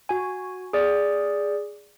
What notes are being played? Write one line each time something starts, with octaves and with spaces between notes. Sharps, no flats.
F#4 G#5
G#4 D5